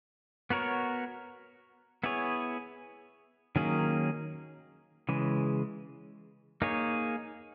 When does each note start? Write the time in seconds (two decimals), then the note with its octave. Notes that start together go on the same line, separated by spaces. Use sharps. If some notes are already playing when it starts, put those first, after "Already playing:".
0.50 B3 F#4 A#4 C#5
2.04 B3 E4 G#4 C#5
3.56 D#3 F#3 A#3 C#4 G#4
5.09 C#3 E3 G#3
6.62 A#3 D#4 G#4 C#5